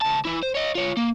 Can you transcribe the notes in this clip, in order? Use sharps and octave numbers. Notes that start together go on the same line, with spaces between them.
C#2 A5
E3 E4
C5
C#5 D#5
F4 C#5
A#3